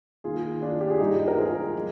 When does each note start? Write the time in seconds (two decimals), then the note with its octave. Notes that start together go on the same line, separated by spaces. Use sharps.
0.24 D#2 D#3 F4 G#4
0.61 D4 F4
0.81 G4
0.90 G#4
0.99 G2 D#3 D#4 G4
1.28 A#4
1.38 F4 G#4
1.75 F3